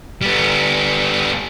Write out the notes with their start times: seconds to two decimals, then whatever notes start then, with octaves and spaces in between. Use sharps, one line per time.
0.22 G3 B3